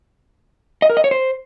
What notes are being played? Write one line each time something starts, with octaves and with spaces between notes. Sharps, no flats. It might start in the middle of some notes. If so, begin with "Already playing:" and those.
D#5
A#4
D#5
C#5
C5